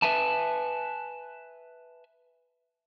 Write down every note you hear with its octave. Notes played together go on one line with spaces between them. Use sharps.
B4 E5 G#5 A5